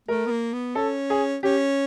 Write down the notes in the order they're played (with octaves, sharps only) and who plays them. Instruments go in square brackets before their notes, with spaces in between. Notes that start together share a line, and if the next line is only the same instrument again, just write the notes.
[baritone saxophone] A3 [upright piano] A#4
[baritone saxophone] B3
A#3
B3
[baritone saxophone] C#4 [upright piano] A4
[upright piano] G#4
[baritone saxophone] C#4 [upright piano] G4